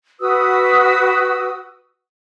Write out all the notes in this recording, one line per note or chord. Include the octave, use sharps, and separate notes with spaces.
F#4 B4 D#6 E6